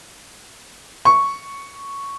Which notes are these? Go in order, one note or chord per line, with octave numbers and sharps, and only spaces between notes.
C#6